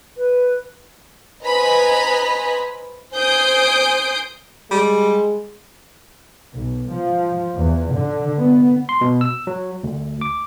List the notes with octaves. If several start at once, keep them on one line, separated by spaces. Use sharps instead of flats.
B4
B4 C5 D#5 G#5 A#5 B5
C5 G#5 D#6 G6 C7 D7
G3 G#3
B1
F3
E2
D3
B3
C6
B2
E6
F#3
D2
D6